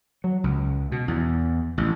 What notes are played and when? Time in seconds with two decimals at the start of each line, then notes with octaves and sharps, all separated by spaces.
0.24 F#3
0.44 C#2
0.92 B2
1.08 E2
1.78 A1